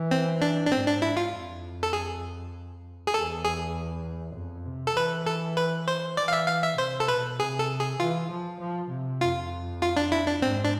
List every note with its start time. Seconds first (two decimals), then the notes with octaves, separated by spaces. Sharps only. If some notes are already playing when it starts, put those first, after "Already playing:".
Already playing: E3
0.11 C4
0.42 D4
0.66 D4
0.72 G#2 C4
0.87 D4
1.02 E4
1.17 F4
1.33 F2
1.83 A4
1.93 G#4
3.07 G#4
3.14 E2 A4
3.45 G#4
4.35 F2
4.66 C3
4.87 A4
4.96 E3 B4
5.26 A4
5.57 B4
5.88 C5
6.17 E3 D5
6.28 F5
6.33 E5
6.48 F5
6.63 E5
6.78 C3 C5
7.00 A4
7.08 B2 B4
7.39 C3 G#4
7.59 A4
7.80 G#4
8.00 E3 F4
8.30 F3
8.60 F3
8.90 C3
9.21 F2 F4
9.82 F4
9.97 D4
10.12 E4
10.27 D4
10.42 G#2 C4
10.64 D4